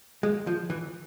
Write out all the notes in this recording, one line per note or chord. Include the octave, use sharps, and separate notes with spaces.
G#3
F3
E3